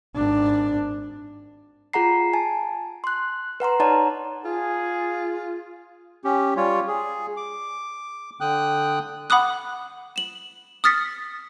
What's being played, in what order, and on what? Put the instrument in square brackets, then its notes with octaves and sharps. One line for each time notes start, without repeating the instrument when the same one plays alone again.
[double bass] G#1 D4
[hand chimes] F4 G#4 F#5 A#5 C7
G#5 A5
C6 F#6
B4 F#5 A#5 C6
D#4 C#5 D5 F#5 A5 A#5
[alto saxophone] F4 [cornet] G#4
[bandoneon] C#4 G4
G3 F4 C#5
G#4
D6
D3 G5 D#6 F#6
[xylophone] F#5 B5 D6 D#6 F#6
E7 F#7
D#6 F6 A6 B6 C#7